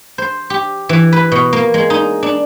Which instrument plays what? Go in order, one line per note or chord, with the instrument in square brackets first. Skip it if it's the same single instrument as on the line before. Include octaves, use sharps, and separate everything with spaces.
[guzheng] C5
G4
E3
B4
B2
A#3
G#3
D#4
D4